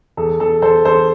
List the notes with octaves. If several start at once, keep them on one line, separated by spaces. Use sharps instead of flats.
E2 A4
E2 A4
E2 A4 C5
E2 A4 C5